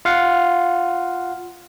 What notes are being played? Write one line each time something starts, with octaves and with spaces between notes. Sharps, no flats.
F4 F5 F#5